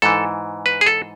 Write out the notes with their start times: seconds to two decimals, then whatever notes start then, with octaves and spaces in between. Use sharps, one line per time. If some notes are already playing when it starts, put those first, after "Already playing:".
0.02 G#2 E3 A4
0.66 B4
0.81 G#4
0.86 A4